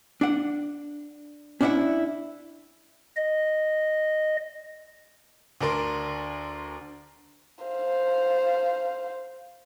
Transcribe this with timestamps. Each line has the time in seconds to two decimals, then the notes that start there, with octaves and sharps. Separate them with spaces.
0.21 D4 F#5
1.61 C#4 D4 E4 D5 E5 F#5
3.16 D#5
5.61 D2 D4 A#4 C6
7.65 C5 F5